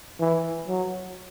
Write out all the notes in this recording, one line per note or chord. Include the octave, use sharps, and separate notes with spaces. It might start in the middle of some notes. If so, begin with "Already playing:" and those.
E3
F#3